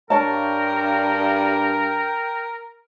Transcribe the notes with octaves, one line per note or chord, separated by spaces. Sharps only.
G2 A#4 C#5 G5 A5